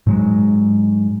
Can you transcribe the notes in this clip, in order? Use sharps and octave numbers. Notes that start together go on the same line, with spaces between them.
G#2 F#3 G#3